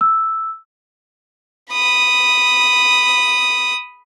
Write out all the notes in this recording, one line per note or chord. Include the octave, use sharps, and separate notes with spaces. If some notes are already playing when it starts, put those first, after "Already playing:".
E6
B5 D#6